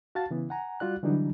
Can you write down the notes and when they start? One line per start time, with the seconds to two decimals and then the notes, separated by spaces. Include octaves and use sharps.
0.15 F#4 F5 A5 A6
0.31 C#3 E3 B3
0.50 F#5 G#5 A#5
0.80 G3 F4 F#4 D5 F#6
1.03 D3 E3 F#3 G3 D4 D#4